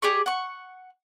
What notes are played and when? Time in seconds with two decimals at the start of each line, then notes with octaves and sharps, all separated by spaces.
0.02 G4 G#4 D5 C#6
0.26 F#5 C#6